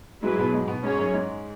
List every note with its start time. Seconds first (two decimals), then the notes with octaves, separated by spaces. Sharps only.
0.22 G#2 F#3 G#3 E4 G#4 B4
0.38 B2 B3
0.54 G#2 G#3
0.68 B2 B3
0.83 G#2 G#3 C#4 G#4 C#5
0.98 F#2 F#3
1.14 G#2 G#3